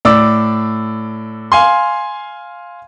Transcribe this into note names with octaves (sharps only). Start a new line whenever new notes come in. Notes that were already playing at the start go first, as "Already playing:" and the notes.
A2 D5 D6 E6
F5 G#5 C6